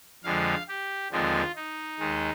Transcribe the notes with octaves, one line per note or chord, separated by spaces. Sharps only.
F2 D3 F3 G#3 F5
G4
D#2 D3 F3 G#3 C4 F4
D#4
D#2 D#3 G#3